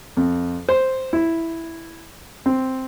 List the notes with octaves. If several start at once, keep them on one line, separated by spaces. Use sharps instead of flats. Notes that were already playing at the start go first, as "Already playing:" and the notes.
F2
C5
E4
C4